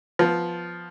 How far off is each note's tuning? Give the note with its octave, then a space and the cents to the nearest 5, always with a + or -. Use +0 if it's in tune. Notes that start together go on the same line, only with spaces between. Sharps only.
F3 +0 B3 +0